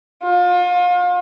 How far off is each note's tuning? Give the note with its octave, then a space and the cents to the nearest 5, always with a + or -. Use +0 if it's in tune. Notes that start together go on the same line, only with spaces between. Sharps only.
F4 +35